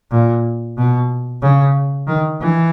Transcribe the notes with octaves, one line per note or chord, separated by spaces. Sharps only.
A#2
B2
C#3
D#3
E3